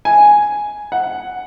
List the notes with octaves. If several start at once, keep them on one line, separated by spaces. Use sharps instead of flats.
G#5
F#5